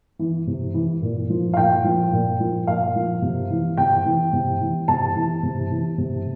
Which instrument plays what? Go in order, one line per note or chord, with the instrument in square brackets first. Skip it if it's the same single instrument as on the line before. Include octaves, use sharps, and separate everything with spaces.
[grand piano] E3
C3
E3
A#2
F3
F5
A#2 G5
F3
A#2
F3
A#2 F5
F3
C3
E3
C3 G5
E3
C3
E3
C3 A5
E3
C3
E3
C3